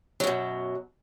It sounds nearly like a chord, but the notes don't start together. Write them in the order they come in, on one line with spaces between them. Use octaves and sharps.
F#3 F#2 B2